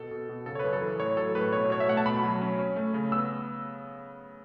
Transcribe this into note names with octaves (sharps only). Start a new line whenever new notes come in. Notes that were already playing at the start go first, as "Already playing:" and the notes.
Already playing: B2 A4
B2
B2
C#3 A4
C#5
B4
F#2
A4
E3
A2 C#5
F#3 A4
A2 B4
B2 C#5
B2 C#5
E5
A3 F#5
A5
B2 B5
F#3
C#4
C#4
A3
C#3
B3 E6